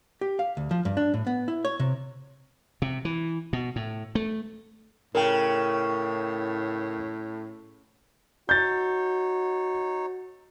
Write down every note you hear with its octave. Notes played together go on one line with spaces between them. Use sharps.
G4
F5
D2
F3
G2
D4
A2
B3
E4
C#5
C3
C3
E3
B2
A2
A3
A2 C#3 A#4 G5
D#4 F#4 C#5 G6 A6